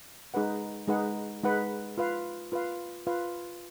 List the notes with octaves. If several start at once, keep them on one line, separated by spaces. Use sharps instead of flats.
G#3 D#4 G#4 B4 F#5
G#3 D#4 G#4 B4 F#5
G#3 D#4 G#4 B4 F#5
F4 B4 F5
F4 B4 F5
F4 B4 F5